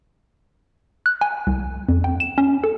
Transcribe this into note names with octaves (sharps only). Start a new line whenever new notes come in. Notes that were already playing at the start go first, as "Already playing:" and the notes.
F#6
G#5
C2
F2
G5
E7
C#4
A4